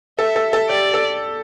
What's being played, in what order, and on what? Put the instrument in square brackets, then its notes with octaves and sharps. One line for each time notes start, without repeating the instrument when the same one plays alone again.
[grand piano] A4 [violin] E5
[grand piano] A4
A4
[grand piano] G4 [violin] D5
[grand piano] A4